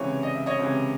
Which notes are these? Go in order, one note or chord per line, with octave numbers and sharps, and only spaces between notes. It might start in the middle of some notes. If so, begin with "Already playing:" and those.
Already playing: C#2 C3 E3 C#5
D#5
E5
C#5 D#5
C#2 C3 E3